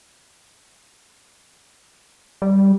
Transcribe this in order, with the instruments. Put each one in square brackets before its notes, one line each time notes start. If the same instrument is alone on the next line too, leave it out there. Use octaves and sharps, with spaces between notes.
[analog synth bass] G3